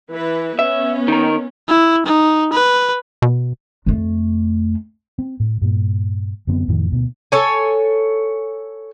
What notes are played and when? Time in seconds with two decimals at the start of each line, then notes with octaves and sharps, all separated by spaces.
0.12 E3 E4 B4
0.59 B3 C#4 E5
1.08 D#3 A#4
1.69 E4
2.06 D#4
2.53 B4
3.22 B2
3.86 F2 A3
5.19 C4
5.40 A2
5.62 G2 A#2
6.47 F#2 D3 B3 C4
6.68 F2 A2 D#3 F3
6.91 D2 B2
7.32 A4 C#5 G#5